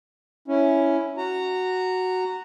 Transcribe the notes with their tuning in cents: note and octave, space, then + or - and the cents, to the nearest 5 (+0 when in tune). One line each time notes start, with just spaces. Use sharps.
C#4 +5 E4 +0
F#4 +0 A#5 -15